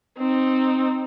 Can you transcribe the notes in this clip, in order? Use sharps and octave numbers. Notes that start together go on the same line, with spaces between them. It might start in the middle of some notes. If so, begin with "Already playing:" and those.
C4 D#4